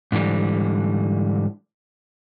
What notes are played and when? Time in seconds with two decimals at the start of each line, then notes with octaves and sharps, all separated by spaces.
0.12 G#2 D3 E3 G3